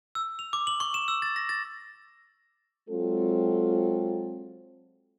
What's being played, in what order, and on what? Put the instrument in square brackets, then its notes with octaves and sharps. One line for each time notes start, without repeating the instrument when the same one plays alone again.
[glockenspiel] E6
F7
D6
F#7
C#6
E7
E6
A6
A#6
A6
[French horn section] F#3 G#3 C4 F4 A4